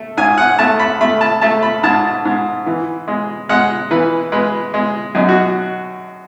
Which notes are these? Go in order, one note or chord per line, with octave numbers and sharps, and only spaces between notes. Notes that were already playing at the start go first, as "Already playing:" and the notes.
Already playing: A3
G#2 G#5
F#5
A3 A5
B5
A3 B5
A5
A3 A5
B5
G#2 A5
G#2
E3
G#3
G#3 F#5
E3 B4
G#3 B4
G#3
F#2 D#4
F#4